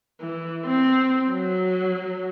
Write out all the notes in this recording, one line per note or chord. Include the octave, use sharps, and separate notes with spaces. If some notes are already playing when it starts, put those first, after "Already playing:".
E3
C4
F#3